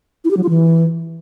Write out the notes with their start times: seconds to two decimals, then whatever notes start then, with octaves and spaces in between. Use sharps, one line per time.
0.24 E4
0.31 G4
0.37 F#3
0.43 F4
0.49 E3